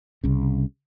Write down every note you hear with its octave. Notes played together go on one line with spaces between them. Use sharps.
C2 C#3